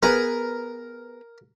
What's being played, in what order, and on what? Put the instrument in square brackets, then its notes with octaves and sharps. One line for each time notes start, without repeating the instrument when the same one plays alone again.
[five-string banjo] B3 G#4 B4 [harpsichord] A#4